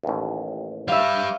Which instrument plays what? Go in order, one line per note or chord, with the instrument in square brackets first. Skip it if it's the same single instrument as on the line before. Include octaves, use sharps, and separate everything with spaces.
[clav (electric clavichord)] A1 D#2
[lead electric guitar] G3 B4 [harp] E5 F5